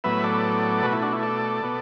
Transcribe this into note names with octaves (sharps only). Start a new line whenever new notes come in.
A2 F#3 B3 B4 E5
A4 D5
B2 A3 F#4 B4
E4
D4 F#4
E4
A4 D5
B2 B3